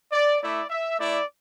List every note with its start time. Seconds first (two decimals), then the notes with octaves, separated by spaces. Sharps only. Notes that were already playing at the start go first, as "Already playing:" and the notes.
0.12 D5
0.42 A3 E4 D5
0.70 E5
0.99 A3 E4 D5